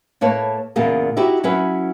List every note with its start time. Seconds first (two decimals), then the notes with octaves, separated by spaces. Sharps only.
0.21 A2 A#3 B4 C#5 A5
0.76 E2 A#2 C#3 A#3 B3
1.17 D#4 E4 F#4 G4 E5
1.44 F#3 C#4 E4 B4